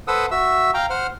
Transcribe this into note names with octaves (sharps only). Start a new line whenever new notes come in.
A4 B4 C5 F#5 D#6 E6
F#4 E5 E6
F5 G5 A#5
C5 F#5 F6